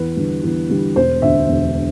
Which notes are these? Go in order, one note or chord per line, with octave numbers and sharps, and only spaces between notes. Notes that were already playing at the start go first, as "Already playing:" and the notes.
Already playing: E2 B4
D3 G3
E2
D3 G3
E1 C5
D2 D3 E5
E1